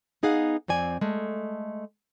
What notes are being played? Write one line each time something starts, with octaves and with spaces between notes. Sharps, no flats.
B3 D#4 G#4 F5 F#5
F2 C4 D5 G#5
G#3 A3